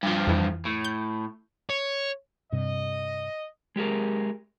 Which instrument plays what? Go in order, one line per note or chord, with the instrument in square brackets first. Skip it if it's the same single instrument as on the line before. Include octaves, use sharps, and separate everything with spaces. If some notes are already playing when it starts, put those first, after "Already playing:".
[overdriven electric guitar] G2 F3
[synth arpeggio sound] F2 E3
[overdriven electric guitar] A2
[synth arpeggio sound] G6
[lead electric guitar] C#5
[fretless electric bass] G2 C3 [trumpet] D#5
[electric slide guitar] G#3 G4 G#4 A#4